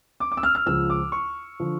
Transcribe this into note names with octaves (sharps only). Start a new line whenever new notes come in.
D6
D6
E6
F6
F6
C#2 C#3 F3 E6
D6
C#6
D3 F3